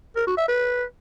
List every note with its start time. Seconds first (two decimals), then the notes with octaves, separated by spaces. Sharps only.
0.16 A#4
0.27 F#4
0.37 E5
0.48 B4